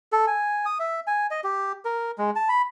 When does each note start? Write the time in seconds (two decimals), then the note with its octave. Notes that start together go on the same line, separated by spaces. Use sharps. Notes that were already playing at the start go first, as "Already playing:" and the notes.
0.12 A4
0.27 G#5
0.66 D#6
0.80 E5
1.07 G#5
1.31 D#5
1.44 G4
1.85 A#4
2.18 G#3
2.36 A5
2.49 B5